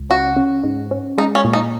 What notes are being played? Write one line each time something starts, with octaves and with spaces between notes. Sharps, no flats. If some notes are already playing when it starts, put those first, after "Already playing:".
Already playing: C#2
C#4 F#4
C#4
G#2
C#4
G#3 D#4
C#4
A#2
D#4